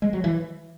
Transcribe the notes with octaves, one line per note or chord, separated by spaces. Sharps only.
G#3
F#3
E3